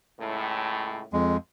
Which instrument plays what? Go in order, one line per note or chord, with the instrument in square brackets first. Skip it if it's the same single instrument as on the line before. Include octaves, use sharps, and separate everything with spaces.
[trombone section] C#2 A2
[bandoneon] F2 G#3